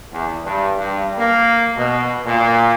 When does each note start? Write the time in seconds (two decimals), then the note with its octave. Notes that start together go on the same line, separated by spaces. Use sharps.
0.11 E2
0.43 G2
0.78 G2
1.17 A#3
1.75 B2
2.25 A#2